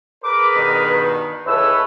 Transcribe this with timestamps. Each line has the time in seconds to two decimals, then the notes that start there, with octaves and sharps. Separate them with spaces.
0.24 G#4 A#4 B4 D6
0.56 G2 B2 D#3
1.46 C#2 E3 A4 B4 C#5 E6